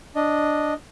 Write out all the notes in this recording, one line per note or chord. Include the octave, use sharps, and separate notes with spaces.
D4 D#5